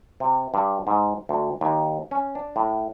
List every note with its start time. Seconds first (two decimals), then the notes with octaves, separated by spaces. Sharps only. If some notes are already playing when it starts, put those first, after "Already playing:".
0.20 C3
0.54 G2
0.87 G#2
1.29 D2
1.61 D#2
2.11 C#4
2.35 D4
2.56 A2